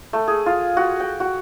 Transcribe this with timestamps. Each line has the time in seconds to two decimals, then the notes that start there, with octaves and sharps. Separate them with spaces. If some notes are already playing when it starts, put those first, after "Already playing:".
0.13 A3
0.28 G#4
0.46 F4
0.77 F#4
1.00 G5
1.20 F#4